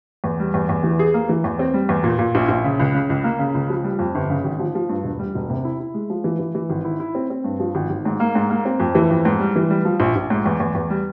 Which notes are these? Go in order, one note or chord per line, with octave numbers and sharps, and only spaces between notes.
E2
G3
E2
E2
E3
G#4
A#3
E3
E2
C4
G3
E2
A#2
A#2
A#1
A#1
C#3
C#2
C#3
C#2
A#3
C#3
C#2
F3
G3
F2
G1
C#3
G#1
F3
F3
G2
E1
G3
E1
C3
E4
E4
G#3
F3
E3
E3
E3
G#1
E4
E4
C4
C4
G2
F3
G#1
G#1
G#2
A#3
G#2
A#3
C4
F2
E3
F2
G#2
G3
E3
G3
F3
A#1
A#1
G#2
E2
E2
E2
G3